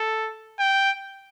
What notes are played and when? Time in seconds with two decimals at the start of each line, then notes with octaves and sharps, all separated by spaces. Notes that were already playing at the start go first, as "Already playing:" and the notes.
Already playing: A4
0.59 G5